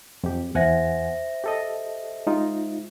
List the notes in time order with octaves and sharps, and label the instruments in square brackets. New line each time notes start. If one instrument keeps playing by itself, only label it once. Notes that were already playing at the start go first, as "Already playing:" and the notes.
[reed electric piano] F2 G4
[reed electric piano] E2 F#5 G#5 [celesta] C5 E5 A#6
[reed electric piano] G4 A4 D#5
G#3 D#4 F4